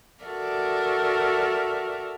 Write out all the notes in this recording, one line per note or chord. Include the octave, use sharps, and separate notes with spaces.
F#4 A4 A#4 D5 E5